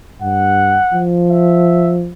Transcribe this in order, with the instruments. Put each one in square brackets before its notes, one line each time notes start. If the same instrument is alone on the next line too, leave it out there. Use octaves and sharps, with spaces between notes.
[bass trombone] G2 [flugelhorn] F#5
[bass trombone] F3
[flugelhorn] E5